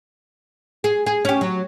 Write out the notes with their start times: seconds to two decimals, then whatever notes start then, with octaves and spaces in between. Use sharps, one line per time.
0.84 G#4
1.06 G#4
1.25 C#4 G4
1.41 F#3